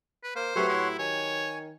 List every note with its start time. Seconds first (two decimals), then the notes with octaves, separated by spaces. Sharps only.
0.23 B4
0.36 A#3 C5
0.56 F#3 A3 G4 B4 C#5 F#5 C6
0.69 A2 E4
0.99 D#3 C#5 G#5